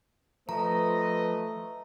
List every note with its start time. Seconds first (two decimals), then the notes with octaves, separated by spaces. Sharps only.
0.49 F3 A3 B4 D#5 A#5